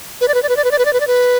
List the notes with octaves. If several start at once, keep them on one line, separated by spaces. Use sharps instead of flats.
B4
D5
B4
D5
B4
D5
B4
D5
B4
D5
B4
D5
B4